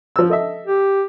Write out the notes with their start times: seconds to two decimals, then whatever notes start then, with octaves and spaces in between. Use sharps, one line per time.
0.16 F3 E6
0.30 A4 D#5 E5
0.66 G4